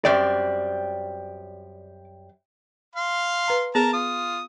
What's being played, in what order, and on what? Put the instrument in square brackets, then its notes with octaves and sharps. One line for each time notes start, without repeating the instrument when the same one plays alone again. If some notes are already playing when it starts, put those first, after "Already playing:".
[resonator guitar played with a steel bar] F#2 G3 C4 [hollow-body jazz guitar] D5
[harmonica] F5 C6
[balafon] B4 A#5
[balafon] B3 G#4 [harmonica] A#4 A5 A#5
[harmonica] F4 D#6